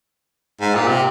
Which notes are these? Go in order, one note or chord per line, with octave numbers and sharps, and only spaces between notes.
G#2
A#2
C3